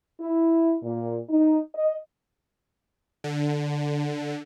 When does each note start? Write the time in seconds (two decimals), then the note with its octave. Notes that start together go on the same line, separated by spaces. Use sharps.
0.21 E4
0.83 A#2
1.29 D#4
1.74 D#5
3.24 D3